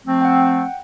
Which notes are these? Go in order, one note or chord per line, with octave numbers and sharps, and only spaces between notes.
F3 A3 C4
F#5 G5